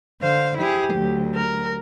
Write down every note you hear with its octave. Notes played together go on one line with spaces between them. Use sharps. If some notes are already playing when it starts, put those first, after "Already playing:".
D3 C5 F5
E4 G4 G#4
D2 F#3
A#4